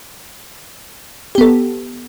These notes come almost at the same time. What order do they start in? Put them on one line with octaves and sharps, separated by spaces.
G4 B3 A4